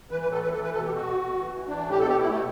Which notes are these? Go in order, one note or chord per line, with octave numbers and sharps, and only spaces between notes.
E3 B4
B4
A2
A4
E3 B4
A4
E3
B4
B2 A4
G4
B2
F#4
B2
B2
E3
E3
E3 D4
A2
G4
B2 A4
G4
B2
E4
B2 A3